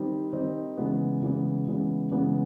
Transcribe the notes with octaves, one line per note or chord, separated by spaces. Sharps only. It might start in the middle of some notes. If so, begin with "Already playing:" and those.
Already playing: D#3 G3 C4 D#4
D#3 G3 C4 D#4
C#3 E3 G#3 B3
C#3 E3 G#3 B3
C#3 E3 G#3 B3
C#3 E3 G#3 B3